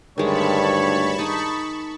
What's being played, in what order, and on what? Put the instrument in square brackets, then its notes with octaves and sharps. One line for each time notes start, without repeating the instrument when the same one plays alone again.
[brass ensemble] D2 C#5 [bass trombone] G2 [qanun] D#3 G#3 [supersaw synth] A5 B5 C#6
[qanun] D#4 G#4